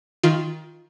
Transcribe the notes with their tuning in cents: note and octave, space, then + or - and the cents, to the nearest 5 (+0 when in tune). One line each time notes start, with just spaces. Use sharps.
D#3 +20 F4 +0